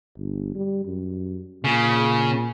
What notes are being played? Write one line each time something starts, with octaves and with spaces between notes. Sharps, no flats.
G1
G3
F#2
A#2 C#3